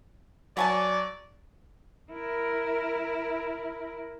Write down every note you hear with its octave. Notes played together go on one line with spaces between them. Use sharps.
F#3 B3 D5 F#5 G#5 A5 C#6
E4 A#4